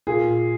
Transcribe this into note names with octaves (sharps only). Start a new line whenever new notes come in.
A#2 G#4